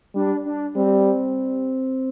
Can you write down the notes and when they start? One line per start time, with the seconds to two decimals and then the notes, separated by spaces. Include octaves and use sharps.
0.15 G3 D4
0.45 D4
0.75 G3 C4